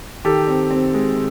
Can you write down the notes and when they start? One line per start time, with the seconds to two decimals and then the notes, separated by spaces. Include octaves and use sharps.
0.25 D#3 G4 A4
0.47 C4
0.71 C4
0.94 G#3